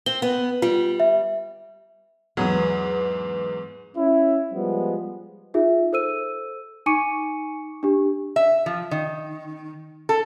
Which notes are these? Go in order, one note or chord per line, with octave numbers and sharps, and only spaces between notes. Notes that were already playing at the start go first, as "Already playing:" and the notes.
C4 G7
B3
G3 F4
E5
E2 G#2 F#3 B3 B4
C#4 E4
F3 G3 G#3 B3
D#4 F4 G#4 E5
A4 C5 E6 D#7
D#4 G#5 C#6 D6 C#7 D#7
D4 G4
E5
F3
D#3
A4